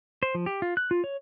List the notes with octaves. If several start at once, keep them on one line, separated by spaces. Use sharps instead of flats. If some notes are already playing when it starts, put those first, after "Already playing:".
C5
F3
G4
F4
F#6
F4
C#5